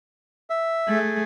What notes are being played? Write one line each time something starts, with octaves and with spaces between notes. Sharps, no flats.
E5
A3 G#4